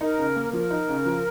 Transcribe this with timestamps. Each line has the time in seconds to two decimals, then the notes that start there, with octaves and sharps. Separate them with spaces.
0.01 D#4 A#4
0.18 C#3
0.36 A#3
0.53 F3 A#4
0.70 D#4
0.88 C#3
1.06 F3